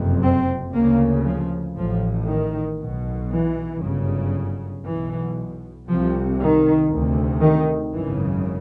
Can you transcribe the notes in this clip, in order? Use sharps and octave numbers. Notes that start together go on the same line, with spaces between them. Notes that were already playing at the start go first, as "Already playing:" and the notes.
Already playing: F#1 F2 C3
C4
D2 C#3 A#3
F3
A1 A2 F3
D#3
B1 B2
E3
G1 F#2 C#3
B1 B2 E3
C2 C3 F3
D#3
D2 C3
D#3
G#1 F#2 C#3 E3